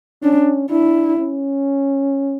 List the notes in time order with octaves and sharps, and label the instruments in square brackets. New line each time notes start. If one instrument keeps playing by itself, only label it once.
[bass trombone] C#4 [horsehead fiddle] D4
[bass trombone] D4 [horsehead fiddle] E4
[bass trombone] C#4